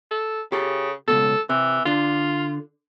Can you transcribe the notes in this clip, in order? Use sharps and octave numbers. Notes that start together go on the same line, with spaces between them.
A4
C#3 G4 A4
C#2 G2 B2 A4
C3 E3
D3 D4 F4